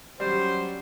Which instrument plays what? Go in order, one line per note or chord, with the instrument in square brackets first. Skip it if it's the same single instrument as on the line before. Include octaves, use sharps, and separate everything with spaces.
[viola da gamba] F#3 C#4 [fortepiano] G3 [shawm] C5